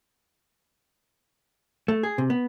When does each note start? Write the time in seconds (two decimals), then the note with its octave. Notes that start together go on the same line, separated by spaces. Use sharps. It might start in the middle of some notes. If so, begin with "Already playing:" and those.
1.88 A3
2.03 G#4
2.18 C3
2.30 B3